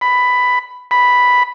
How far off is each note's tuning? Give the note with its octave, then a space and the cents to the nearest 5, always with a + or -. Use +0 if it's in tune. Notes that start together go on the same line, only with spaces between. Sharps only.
B5 +10
B5 +0